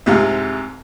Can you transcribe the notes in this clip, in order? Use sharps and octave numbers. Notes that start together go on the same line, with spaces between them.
C2 G#2 C3 F4